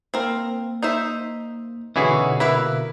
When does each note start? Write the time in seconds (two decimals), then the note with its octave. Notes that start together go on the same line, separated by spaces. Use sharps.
0.14 A#3 C4 A#4
0.83 D#4 C5 E5
1.96 B2 D3 E3 C#4 D#4 E4 F#4 G#4
2.40 A#3 E4 A#4 B4 E5